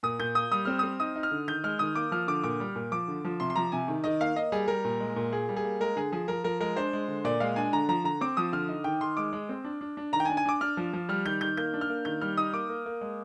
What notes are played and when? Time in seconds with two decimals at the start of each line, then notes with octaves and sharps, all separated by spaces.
0.03 A#2 D#6
0.19 A#2 G6
0.35 A#3 D#6
0.52 G3 D#6
0.65 C4 F6
0.79 C4 D#6
1.00 D#4 D#6
1.16 D#4
1.23 F6
1.31 D3
1.48 D#3 G6
1.64 G#3 F6
1.79 D#3 D#6
1.95 A#3 D6
2.11 F3 F6
2.28 D3 D6
2.44 A#2 D6
2.60 G3
2.75 A#2
2.92 F3 D6
3.08 D3
3.24 F3
3.40 C3 C6
3.50 C6
3.56 F3 A#5
3.72 C3 G#5
3.88 D#3
4.04 D#3 D#5
4.20 A#3 F5
4.36 A#3 D#5
4.52 G3 G#4
4.68 G3 A#4
4.85 A#2
5.00 G#3
5.16 A#2
5.32 A#3 G#4
5.49 G3
5.57 G#4
5.64 A#3
5.80 G#3 A#4
5.96 D3 G#4
6.12 F3 G#4
6.28 F3 A#4
6.44 F3 A#4
6.60 G#3 A#4
6.77 D4 C5
6.93 G#3
7.08 D3
7.24 A#2 D5
7.40 G#3 F5
7.56 D4 G#5
7.73 D3 A#5
7.89 F3 A#5
8.04 D3 A#5
8.21 C4 D6
8.37 F3 D#6
8.53 D3 F6
8.69 D#4
8.84 D#3 G5
9.01 D#3 C6
9.17 G#3 D6
9.33 G#3
9.49 C4
9.65 D4
9.81 D4
9.97 D4
10.13 D#3 A#5
10.20 G5
10.25 G#5
10.29 D4
10.37 G#5
10.45 D4 D6
10.61 D4 F6
10.77 F3
10.93 F3
11.09 G3 F6
11.25 D#3 G6
11.41 D#3 G6
11.57 A#3 G6
11.74 D4
11.81 F6
11.89 A#3
12.05 D#3 G6
12.21 G3 F6
12.37 D#4 D#6
12.53 A#3 D6
12.69 A#3
12.86 A#3
13.01 G#3